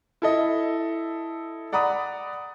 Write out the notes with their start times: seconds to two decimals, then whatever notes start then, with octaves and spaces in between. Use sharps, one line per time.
0.22 E4 A4 D#5
1.73 D5 F#5 A#5 B5 D#6